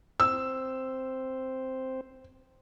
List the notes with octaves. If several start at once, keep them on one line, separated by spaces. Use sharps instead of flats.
C4 C5 E6